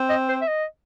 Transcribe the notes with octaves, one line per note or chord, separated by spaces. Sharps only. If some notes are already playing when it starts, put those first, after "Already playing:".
Already playing: C4
D#5
C5
E5
D#5